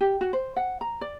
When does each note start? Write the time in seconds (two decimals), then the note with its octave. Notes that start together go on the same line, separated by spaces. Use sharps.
0.01 G4
0.21 F#4
0.33 C5
0.56 F#5
0.81 A#5
1.01 D5